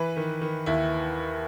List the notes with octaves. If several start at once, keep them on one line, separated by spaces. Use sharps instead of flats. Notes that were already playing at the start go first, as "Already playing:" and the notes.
Already playing: E3 B4
D#3
D#3
D#2 E4